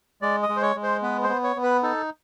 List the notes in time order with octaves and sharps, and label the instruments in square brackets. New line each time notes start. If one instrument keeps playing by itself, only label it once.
[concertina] G#3 D5
D#5
G#3
C5
C#5
G#3
C5
B3 B4
C5
B3
C#5
B3
B4
D#4 A4